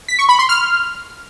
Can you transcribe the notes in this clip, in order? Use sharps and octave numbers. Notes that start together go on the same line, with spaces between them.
B6
C#6
B5
C6
F6